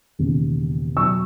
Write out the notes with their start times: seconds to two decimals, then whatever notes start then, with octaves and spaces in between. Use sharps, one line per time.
0.19 E1 D#2 C#3
0.97 B1 B2 F#3 C#6 E6